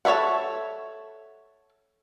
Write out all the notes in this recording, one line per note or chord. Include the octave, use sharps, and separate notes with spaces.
A4 C#5 D5 E5 F#5